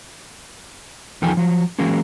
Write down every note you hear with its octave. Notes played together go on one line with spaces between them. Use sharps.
E2 D#3 F3 G#4 G5 G#5
F3 F#3
E3 F#3 G#3 A#3 C#4